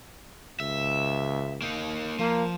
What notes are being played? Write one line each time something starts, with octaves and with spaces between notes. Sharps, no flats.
C#2 E5
A#3 D#4
F3 A#3